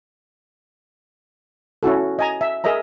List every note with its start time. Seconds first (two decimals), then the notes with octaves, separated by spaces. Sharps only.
1.83 C#4 E4 F#4 A4
2.19 D#5 G#5 A#5
2.41 E5
2.64 G#4 A#4 D#5 E5 A#5